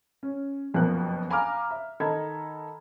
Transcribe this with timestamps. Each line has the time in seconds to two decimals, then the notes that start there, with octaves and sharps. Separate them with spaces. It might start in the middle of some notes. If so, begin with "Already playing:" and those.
0.23 C#4
0.74 F#1 F2 B2 F3 A#4 F#6
1.30 F5 G#5 A#5 B5 D6 F6
1.71 E5
2.00 D#3 D#4 A4 A#5 B5 G#6